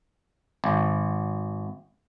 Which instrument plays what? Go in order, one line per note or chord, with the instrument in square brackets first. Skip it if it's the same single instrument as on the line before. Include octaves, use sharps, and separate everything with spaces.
[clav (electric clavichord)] G#1